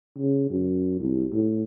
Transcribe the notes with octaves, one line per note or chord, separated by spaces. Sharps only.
C#3
F#2
C2
A2